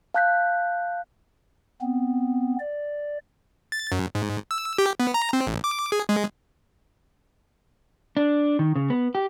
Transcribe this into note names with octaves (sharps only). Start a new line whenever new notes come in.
F5 A5 F#6 G6 B6
B3 C4
D5
A6
F#2
G#2
E6
G4
B3
A#5
C4
A1
D6
G#4
G#3
D4
D#3
C#3
B3
G4